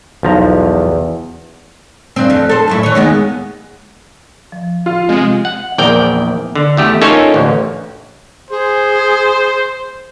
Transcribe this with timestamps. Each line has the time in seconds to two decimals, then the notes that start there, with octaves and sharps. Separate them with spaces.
0.23 B1 E2 F3 A#5
2.16 G2 C4
2.30 F2
2.49 A4 C5
2.68 F#2 A2 E4
2.83 E3 C#5
2.95 D#2 G#3 B3
4.52 F3
4.86 F4
5.09 C3 G#3
5.45 F#5
5.78 A#1 E2 A#4 D5 G5
6.55 D3
6.77 E2 A3 G4
7.02 C#4 D#4 F4 A4 A#4 C#5
7.34 A1 D2
8.50 G#4 C5